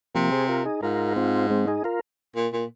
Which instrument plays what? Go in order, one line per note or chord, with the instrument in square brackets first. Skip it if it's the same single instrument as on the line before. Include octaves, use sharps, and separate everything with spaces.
[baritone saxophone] C3 [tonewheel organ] F3 A#3
[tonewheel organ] G#4 C5
F4 A#4
D#4 G#4
[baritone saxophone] G#2 [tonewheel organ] F4 A#4
[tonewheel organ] C4 F4
G#3 C4
D#4 G#4
F4 A#4
[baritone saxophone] A#2
A#2